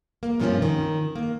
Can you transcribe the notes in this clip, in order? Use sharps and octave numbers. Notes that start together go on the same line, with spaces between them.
A#3
G2 C3 F3 A#3 C4 C#4
D#3
A#3